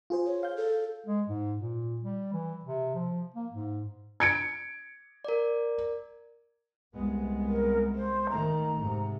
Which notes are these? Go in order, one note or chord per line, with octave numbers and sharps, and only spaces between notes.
F4 G#4 C5
C#5
F5 G6
A4
G#3
G#2
A#2
G3
E3
C3
F3
A#3
G#2
G#6 C#7 D7
A#4 D5
C2 G#3 B3
A#4
C5
D#3 A3 A#5
G#2 C3